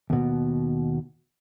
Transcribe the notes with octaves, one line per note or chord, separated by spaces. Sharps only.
D#2 B2